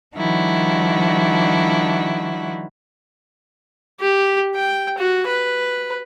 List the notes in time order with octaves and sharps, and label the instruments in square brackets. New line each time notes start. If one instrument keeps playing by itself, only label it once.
[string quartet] D#3 F3 G3 D4 E4 F#4
[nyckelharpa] G4
G5
F#4
B4